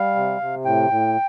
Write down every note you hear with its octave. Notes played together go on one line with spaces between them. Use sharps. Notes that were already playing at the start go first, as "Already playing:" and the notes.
Already playing: G3 F5
C3
C3
A2 G5
A2